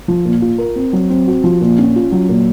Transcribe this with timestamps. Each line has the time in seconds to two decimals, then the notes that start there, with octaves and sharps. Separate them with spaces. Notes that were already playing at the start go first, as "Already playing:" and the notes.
0.08 F3
0.25 A#2
0.42 F4
0.58 A#4
0.76 C4
0.93 F#3
1.10 C4
1.27 F#4
1.44 F3
1.61 A#2
1.79 C#4
1.96 F4
2.12 F#3
2.29 A#2